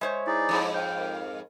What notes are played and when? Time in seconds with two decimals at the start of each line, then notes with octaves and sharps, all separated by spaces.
0.01 G#3 C5 C#5 E5
0.27 D#4 E4 G#4 D5 A6
0.49 F2 G#2
0.74 F5 G5 G6
1.00 A#4